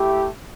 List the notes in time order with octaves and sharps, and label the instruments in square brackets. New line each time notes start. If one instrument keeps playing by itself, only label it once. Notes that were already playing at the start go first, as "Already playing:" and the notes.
Already playing: [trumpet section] A3 E4 G4